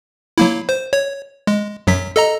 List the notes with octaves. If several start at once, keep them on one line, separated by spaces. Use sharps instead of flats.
F#3 A#3 E4
C5
C#5
G#3
F#2 F#3 B6
A4 D#5 A#5